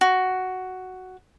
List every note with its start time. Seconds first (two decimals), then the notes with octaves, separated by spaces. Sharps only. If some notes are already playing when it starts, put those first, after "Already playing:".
0.01 F#4